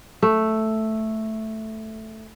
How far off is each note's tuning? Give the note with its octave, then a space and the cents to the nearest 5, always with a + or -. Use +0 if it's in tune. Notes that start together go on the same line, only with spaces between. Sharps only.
A3 +0